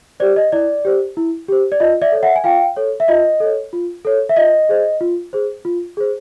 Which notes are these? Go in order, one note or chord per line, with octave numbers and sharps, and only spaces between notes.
G4 C5 D5
D#5
E4 D5
G4 C5
E4
G4 C5
D5
F4 D#5
D5 E5
A4 C#5
E5 F#5
G#5
F4 F5 G5
A4 C#5
E5
F4 D#5
A4 C#5
F4
A4 C#5
E5
F4 D#5
G#4 C5
F4
G#4 C5
F4
G#4 C5